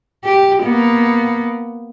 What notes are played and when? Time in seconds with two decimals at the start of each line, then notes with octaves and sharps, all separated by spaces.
0.24 G4
0.63 A#3 B3